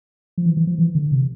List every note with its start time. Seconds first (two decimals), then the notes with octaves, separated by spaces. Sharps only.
0.38 F3
0.46 E3
0.57 E3
0.67 F3
0.78 E3
0.95 D3
1.12 C3